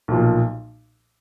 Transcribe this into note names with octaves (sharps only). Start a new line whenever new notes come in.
B1 A#2 F3